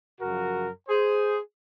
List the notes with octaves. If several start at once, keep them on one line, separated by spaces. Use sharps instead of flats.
F#2 C#3 F3 F#4 A#4
G#4 C5